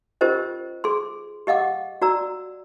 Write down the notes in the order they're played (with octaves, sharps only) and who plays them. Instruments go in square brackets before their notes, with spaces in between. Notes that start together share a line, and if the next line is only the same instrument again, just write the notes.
[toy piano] C#4 F4 G4 A#4 C5 D#5
G#4 C6
G4 D#5 F5 F#5 D6
F#4 D5 A#5 E6